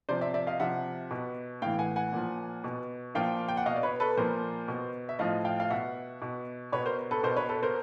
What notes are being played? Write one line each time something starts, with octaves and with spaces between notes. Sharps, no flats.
C3 F3 C5 D5
D5 E5
D5 E5
D#5 F5
C3 F3 E5 F#5
B2
A2 E3 F5 G5
F#5 G#5
F#5 G#5
A#2 F3
B2
A#2 F3 F5 G5
G5
F#5
B2 D#5 F5
D5
B4 C#5
A4 B4
A#2 F3 A#4 C5
B2
E5
A2 F3 D#5 F5
F5 G5
F5
B2 E5 F#5
B2
B2 B4 C#5
A#4 C5
A4 B4
B2 A#4 C5
B4 C#5
A4 B4
A#4 C5